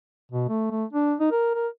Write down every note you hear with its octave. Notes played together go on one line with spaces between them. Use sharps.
B2
A3
A3
D4
D#4
A#4
A#4